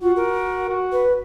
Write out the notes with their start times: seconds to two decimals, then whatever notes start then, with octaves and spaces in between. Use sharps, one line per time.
0.01 F4 F#4
0.16 A#4
0.69 F#4
0.92 B4